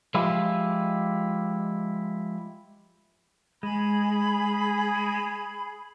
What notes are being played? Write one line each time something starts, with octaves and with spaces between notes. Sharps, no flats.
F3 G#3 E4 F4 G4
G#3 G#4 B5